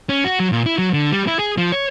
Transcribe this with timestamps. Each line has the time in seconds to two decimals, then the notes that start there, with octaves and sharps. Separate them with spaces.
0.09 C#4
0.24 F#4
0.40 F#3
0.52 A#2
0.66 E4
0.78 F#3
0.93 D3
1.12 G3
1.27 E4
1.39 G#4
1.58 F3
1.72 C#5